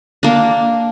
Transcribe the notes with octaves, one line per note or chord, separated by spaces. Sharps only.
A#3 D4